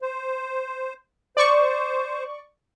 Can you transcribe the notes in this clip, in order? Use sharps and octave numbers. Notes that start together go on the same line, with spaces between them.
C5
C5 D5 C#6